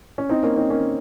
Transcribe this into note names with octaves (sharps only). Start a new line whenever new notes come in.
C#4
C4 D#4
A#3 C#4
C4 D#4
A#3 C#4